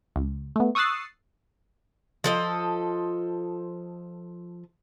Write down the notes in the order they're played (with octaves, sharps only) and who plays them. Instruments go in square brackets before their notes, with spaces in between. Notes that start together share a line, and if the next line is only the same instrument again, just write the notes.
[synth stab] C#2
A3 B3
C#6 D#6 E6 F#6 A6 C7
[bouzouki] F3 A4 D#5